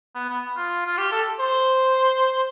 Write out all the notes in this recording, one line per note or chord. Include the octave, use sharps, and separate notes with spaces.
B3
B3
F4
F4
G4
A4
C5